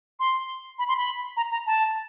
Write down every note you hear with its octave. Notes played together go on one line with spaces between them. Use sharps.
C6
B5
C6
B5
A#5
A#5
A5